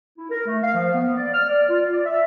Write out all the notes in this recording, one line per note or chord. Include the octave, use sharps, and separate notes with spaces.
E4
A#4
A3
F5
F3
B3
D5
F6
D5
F4
D5
E5